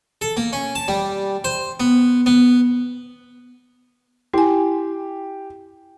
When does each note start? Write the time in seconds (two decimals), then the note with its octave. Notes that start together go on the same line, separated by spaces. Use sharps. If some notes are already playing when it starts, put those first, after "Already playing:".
0.21 A4
0.37 A#3
0.53 C#4
0.75 A5
0.88 G3
1.44 C5
1.80 B3
2.26 B3
4.34 E4 G4 G#5